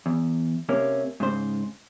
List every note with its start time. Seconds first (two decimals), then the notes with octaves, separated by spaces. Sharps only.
0.06 E2
0.69 C3 A#3 C#4
1.20 G#2 C#3 C5